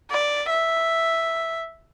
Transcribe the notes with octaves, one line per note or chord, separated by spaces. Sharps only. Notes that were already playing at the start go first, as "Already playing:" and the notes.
D5
E5